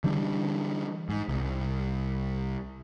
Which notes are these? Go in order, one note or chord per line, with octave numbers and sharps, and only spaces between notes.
D3 E3 G3 D4
G#2
C2